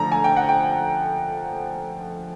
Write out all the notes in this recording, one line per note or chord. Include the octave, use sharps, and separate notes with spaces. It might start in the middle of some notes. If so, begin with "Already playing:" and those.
Already playing: D3 F3 A3 A#5
G#5
G5
F#5
G5